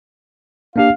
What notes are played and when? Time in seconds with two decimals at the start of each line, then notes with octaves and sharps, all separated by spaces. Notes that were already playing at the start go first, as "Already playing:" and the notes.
0.76 A#3 D4 G4 F5